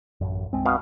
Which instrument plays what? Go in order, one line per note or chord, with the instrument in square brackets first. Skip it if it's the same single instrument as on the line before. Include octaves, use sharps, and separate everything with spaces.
[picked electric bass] A1 F#2
B1 G#3 C4
[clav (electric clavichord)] B2 F5